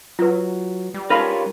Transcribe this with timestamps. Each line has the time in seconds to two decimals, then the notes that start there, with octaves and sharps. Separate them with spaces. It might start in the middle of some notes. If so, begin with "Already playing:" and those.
0.19 F#3 F4 B4
0.94 G3
1.10 C#4 D#4 F4 A#4 B4 F5 B5